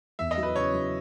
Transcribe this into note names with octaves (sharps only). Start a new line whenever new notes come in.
E2 E5
D#5
F#3
B4
C#3 C#5
F#3